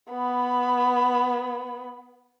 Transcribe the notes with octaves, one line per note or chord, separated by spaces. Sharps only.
B3 B5